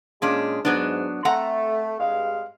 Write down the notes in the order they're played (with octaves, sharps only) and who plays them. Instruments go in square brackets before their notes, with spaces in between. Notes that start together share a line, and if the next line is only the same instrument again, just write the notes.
[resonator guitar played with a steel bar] A#2 C#4 D4 [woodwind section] G#3
[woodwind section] G#2 [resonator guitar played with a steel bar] F#3 B3 D4
[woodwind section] A3 [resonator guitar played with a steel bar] C4 F#5 A#5
[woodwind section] G2 G#3 F5